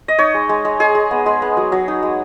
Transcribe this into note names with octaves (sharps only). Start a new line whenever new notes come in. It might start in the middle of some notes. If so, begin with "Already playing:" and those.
D#5
D#4 C#5
G#3
G#3
G#3
G#3 G#4
G#3
B3
G#3
B3
F#3
F#3
D#4
G#3